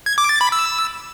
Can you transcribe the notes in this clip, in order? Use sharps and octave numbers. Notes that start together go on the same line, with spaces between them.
G#6
D6
A6
B5
E6